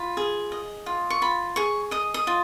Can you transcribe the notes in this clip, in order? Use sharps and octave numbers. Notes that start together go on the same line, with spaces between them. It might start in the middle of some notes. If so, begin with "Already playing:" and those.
Already playing: F4 B5
G#4
D#5
F4
C#6
F4 B5
G#4 C#6
D#5 D#6
D#6
F4